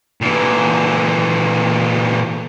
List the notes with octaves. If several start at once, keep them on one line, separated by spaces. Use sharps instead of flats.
A#2 E3